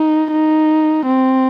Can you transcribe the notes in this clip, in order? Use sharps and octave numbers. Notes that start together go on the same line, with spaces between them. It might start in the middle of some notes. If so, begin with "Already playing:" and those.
Already playing: D#4
D#4
C4